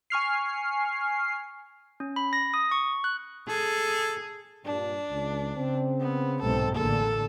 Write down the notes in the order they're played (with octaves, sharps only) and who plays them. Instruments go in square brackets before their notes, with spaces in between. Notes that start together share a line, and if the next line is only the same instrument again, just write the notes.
[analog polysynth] G#5 C#6 F6 C7
[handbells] C#4
B5
A#6
D#6
C#6
F#6
[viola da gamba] G#4 [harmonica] A4
[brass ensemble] G2 A#2 [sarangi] D4
[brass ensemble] C#2
C#3 C4
[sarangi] B3
[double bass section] B1 G#2 [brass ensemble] C3 G#3 C4 [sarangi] A4
[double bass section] A1 D3 A#3 [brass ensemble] E2 A#2 G#4 [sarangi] A4